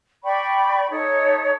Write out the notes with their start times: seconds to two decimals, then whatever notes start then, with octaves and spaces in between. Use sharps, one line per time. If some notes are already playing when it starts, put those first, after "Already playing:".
0.24 D5 G5 B5 C#6
0.91 D#4 A4 C#5 E5